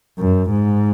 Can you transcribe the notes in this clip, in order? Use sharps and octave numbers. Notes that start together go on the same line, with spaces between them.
F#2
G#2